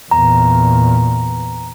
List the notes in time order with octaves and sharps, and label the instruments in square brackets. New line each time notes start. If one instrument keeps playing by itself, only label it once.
[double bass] E2 A#2 [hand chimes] A#5